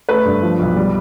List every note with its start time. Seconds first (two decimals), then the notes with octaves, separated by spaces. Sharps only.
0.09 A3 B4
0.25 G2
0.42 F3
0.60 B1
0.76 G3